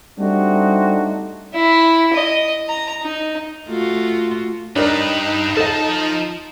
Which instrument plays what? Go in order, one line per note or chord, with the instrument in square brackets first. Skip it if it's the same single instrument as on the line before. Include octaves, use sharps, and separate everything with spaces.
[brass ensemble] G3 A3 C4 D4 D#4 F#4
[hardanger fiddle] E4
D#5
A#5
D#4
[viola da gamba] A3 F4 F#4
[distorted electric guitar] G2 B4 [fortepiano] D4 A#4 [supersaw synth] D#4
[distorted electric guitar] F3 A5 [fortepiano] A4 D#5